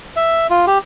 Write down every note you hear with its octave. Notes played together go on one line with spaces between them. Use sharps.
E5
F4
G4